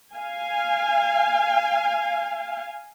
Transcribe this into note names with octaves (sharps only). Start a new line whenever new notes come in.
F5 G#5